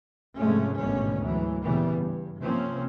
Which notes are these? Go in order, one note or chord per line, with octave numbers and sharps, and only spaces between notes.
G#2 C3 F3 G#3 A3 C#4
A1 G#2 B2 D3 D#3 C#4
D2 G#2 E3 F#3
A#2 C#3 E3 G3 B3
G2
C3 F3 A#3 C4 C#4